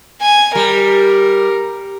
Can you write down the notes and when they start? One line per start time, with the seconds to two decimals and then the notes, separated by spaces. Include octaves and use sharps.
0.22 G#5
0.55 G3 A#4